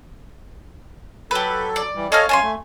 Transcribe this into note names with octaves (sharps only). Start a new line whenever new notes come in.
F#3 G4 A4 B4
D5
E3 G3
G#4 A4 C#5 D#5 F5 F6
F#2 C#5 F5 G#5 A5 C6
A3